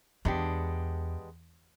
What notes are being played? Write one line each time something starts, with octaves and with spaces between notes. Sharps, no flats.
E2 G#3 B3 D4 G4